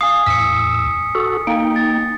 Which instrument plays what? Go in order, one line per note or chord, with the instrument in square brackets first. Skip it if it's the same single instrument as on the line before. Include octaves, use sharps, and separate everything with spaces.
[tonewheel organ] F5 [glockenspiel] G#5 D#6
[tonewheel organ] E2 A2 E6 [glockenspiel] B6 C#7
[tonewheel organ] F#4 A4
A#3 D#4 G5
[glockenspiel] A6